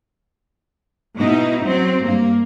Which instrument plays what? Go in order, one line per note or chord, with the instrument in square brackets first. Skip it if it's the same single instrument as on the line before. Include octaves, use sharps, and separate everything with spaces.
[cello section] B2 D#4 E4
F#3 C4
G2 A#3